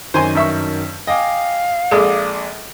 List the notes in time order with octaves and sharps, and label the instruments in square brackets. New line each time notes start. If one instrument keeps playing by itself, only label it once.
[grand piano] F#2 D#3 [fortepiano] C5 G#5 C6
[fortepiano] G2 E5 C#6
[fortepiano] D#5 [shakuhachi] F5 [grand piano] G5 G#5 D6
[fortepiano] A#1 G#3 [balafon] G#4 A4 [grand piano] D5 D6 D#6